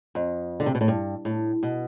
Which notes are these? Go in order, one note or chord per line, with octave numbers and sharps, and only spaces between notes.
F2
D3
C3
B2
A2
G2
A2
B2